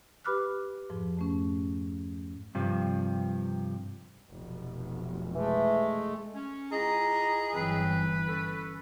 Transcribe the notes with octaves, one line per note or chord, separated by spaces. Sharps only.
G4 B4 B5 D6 F6 F#6
F2 G#2 F3
F2 A3 C#4
G2 C3 F3
F1 B1
E3 G#3 A3
C#4
C#2 E4 G#4 D#5 A#5
G1 E3 F#3 C4 B4
C#4 A4